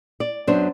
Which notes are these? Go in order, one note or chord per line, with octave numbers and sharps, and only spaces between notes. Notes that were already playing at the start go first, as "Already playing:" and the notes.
D5
F#2 F#3 B3 D4 C5